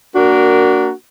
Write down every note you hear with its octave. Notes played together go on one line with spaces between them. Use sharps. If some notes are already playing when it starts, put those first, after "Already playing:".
A#3 D4 F#4 A#4